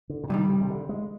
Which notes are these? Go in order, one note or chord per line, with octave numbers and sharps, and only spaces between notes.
D3
A#2
G2 C3 D#3 G3
C3
C3
D3
G#3